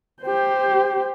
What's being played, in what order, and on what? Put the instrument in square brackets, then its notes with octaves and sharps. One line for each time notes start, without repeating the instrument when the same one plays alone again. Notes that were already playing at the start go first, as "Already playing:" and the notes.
[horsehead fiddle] G4 C5